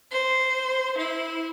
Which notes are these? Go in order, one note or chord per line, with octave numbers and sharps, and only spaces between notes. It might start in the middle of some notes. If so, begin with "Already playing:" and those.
C5
E4